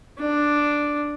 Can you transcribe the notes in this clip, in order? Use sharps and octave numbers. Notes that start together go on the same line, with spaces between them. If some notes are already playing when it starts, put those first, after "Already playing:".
D4